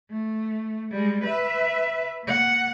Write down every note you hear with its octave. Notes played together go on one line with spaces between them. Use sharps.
A3
G3 G#3
B4 E5
A#3 F#5